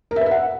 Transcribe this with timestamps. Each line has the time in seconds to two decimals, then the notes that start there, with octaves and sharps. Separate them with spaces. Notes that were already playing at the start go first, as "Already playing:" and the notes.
0.11 A#4
0.16 E5
0.21 B4
0.26 E5
0.31 F#5